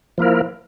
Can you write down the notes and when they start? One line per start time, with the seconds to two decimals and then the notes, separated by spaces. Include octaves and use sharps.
0.18 F3 A#3 E4 A#4